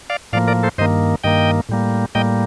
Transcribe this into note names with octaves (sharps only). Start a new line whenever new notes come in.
D5 F5
A2 F3 A#3 D5 F5
A#4 D5
A4 C5
G2 D#3 A#3 C5 D#5
G2 D#3 A#3 D#5 G5
A2 G3 A#3
A2 G3 A#3 D#5 G5